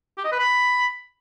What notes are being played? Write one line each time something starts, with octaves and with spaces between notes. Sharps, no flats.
G4
D#5
B4
B5